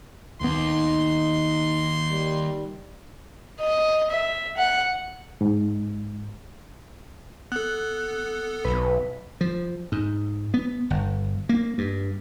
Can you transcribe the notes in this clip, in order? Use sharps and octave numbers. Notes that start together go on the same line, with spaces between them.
D1 D#2 B3 D#4 C6
D#3 G3
D#5
E5
F#5
G#2
B3 A4 F#6
B1 B4
F3
G#2
B3
G1
A#3
G2